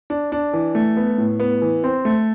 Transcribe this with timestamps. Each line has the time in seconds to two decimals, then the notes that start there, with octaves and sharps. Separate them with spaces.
0.10 D4
0.32 D4
0.54 E3
0.75 A3
0.97 B3
1.18 A2
1.40 B3
1.62 E3
1.84 C4
2.05 A3